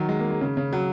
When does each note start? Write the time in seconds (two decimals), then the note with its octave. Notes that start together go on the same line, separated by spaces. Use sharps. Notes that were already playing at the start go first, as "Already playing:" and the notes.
Already playing: D#3 F#3
0.09 G#3
0.19 A#3
0.30 G#3
0.41 C#3
0.57 C#3
0.73 F#3